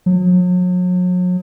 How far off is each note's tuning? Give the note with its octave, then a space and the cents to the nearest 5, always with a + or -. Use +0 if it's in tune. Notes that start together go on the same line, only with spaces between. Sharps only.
F#3 -40